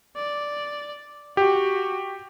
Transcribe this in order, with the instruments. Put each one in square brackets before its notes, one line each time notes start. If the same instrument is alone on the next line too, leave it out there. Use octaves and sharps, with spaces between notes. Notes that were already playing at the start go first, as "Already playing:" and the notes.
[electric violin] D5
[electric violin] F#4 [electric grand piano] G4